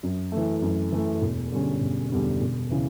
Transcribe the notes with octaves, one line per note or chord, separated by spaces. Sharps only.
F#2
E3 A3
F#2
E3 A3
E1
E2 D3 G3 C#4
E1
E2 D3 G3 C#4
E1
C#3 E3